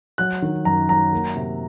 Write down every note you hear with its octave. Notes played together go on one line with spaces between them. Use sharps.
F#3 F#6
D#3
F#2 A#5
F#3 A#5
A#3
C3